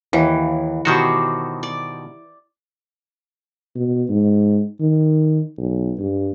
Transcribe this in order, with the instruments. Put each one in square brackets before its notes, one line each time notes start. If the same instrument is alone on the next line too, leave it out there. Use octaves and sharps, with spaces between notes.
[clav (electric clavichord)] D#2 [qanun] E3
[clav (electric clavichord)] B2 D#3 F#4 [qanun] G4 C5 C#5
[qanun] D5
[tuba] B2
G#2
D#3
B1
G2